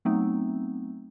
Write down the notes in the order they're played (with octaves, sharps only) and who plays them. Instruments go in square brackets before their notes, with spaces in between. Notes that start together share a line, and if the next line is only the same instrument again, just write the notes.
[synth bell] F#3 A3 B3 C4 D#4